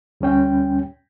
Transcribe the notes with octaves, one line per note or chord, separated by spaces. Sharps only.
D2 G3 C#4 G5